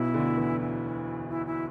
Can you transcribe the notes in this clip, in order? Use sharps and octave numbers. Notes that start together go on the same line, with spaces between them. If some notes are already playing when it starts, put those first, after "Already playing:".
Already playing: B1 B2 E4
D2 D3
E2 E3
E4
E4
E4